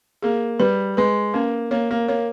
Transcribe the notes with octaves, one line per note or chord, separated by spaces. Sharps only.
A#3 G#4
G3 B4
G#3 B4
A#3 C#4
A#3 C#5
A#3
A#3 C#5